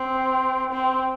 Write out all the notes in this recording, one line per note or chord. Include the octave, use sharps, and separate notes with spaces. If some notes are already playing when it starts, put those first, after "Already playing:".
Already playing: C4
C4